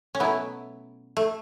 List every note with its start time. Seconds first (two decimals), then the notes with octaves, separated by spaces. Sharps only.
0.15 C#4
0.20 B2 F#3 A3 B3 E4
1.17 A3